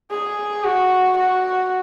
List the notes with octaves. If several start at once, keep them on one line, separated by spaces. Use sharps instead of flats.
G#4
F#4
F#4